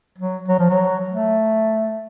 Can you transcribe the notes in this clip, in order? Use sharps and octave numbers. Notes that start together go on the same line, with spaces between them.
F#3
F#3
F3
F#3
A3